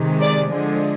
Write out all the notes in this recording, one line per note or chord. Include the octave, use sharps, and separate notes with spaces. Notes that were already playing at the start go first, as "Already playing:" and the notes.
Already playing: C3 D#3 G#3
D5
D3 F3 G#3